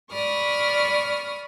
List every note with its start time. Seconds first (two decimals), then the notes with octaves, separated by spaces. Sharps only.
0.12 D5 B5 C#6 D#6 F6